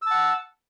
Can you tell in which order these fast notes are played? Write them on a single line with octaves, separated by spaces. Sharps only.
E6 A5 F#5